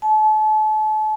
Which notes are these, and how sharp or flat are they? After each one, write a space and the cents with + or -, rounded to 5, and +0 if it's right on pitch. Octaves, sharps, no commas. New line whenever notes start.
A5 -35